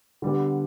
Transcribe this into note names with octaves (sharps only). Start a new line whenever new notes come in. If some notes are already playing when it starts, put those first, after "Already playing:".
D3 G3 B3